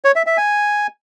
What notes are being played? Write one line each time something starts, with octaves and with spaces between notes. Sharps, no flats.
C#5
E5
E5
G#5